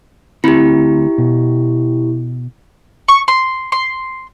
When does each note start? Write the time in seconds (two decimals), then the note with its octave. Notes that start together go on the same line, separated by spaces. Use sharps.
0.44 D2 C4 E4 G4 B5
1.18 B2
3.08 C#6
3.28 C6
3.72 C6